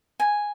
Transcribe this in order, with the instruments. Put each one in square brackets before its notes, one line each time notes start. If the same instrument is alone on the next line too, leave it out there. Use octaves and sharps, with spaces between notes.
[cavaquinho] G#5